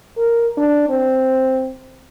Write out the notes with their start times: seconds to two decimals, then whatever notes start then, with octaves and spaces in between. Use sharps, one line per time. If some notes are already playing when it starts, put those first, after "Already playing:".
0.17 A#4
0.57 D4
0.89 C4